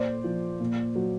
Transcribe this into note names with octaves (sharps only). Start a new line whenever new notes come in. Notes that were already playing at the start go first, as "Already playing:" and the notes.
Already playing: A#2 C5 D5
F3
A#2
F#3